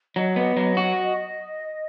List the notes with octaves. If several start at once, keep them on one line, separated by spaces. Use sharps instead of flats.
F#3 D#5
B3
F#3
F#4